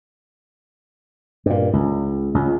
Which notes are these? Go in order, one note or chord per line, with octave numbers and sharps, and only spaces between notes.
G2 A#2
C#2
C#2